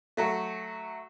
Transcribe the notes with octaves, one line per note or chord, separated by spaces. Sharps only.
F#3 A3